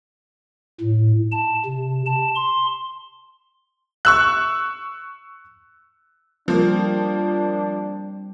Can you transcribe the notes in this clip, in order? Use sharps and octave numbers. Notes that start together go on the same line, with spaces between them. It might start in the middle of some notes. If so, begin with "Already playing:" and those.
A2
A5
C3
A5
C6
C#6 E6 F#6
F3 G3 A#3 C4 D4